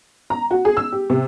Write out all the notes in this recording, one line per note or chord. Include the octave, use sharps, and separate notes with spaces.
A#5
F#4
G#4
E6
G4
C3